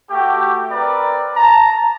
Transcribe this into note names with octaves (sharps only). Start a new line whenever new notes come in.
A3 F#4 G4
C4 A#4 B4 D5
A5 A#5